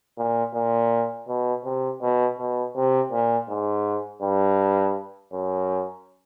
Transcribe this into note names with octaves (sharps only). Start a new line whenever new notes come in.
A#2
A#2
B2
C3
B2
B2
C3
A#2
G#2
G2
F#2